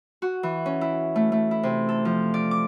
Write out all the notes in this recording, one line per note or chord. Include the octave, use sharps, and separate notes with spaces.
F#4
E3
C#4
E4
A3
A3
E4
C3
A4
F3
D5
D6